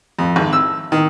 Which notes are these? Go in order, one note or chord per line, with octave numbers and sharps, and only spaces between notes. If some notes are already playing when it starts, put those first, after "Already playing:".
F2
G#1
E6
D#3